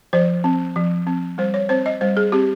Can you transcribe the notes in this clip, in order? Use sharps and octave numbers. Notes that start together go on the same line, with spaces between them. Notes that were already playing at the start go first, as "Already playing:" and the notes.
F3 C5
C4
F3
C4
G3 C5
C#5
C4 C5
D#5
G3 C5
G#4
C4 G4